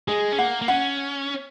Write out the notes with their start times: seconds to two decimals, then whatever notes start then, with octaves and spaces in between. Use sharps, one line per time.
0.08 G#3 G#4
0.32 C#4
0.38 A#3 F#5
0.62 A#3
0.68 C#4 F#5